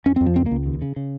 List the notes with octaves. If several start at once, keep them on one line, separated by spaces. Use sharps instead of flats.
F2 C#4
C4
F2
F3
C#2 C4
A#3
C#2
D#2
C#3
C#3